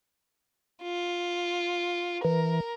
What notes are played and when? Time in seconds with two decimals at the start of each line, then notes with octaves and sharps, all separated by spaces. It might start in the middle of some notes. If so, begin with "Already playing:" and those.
0.83 F4
2.24 E3 A#4